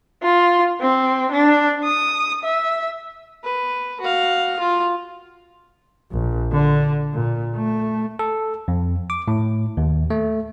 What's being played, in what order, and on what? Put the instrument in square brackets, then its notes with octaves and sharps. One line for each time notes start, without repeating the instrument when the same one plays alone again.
[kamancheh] F4
C4
D4
D#6
E5
[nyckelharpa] B4
F#4 F5
F4
[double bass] A#1
D3
A#2
A3
[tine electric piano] A4
F2
D6
A2
D#2
A3